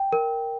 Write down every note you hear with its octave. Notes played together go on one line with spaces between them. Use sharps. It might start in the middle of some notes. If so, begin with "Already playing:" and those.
Already playing: G5
A#4